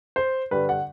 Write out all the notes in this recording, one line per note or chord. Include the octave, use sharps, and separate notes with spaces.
C5
G2 D3 G3 B4
F#5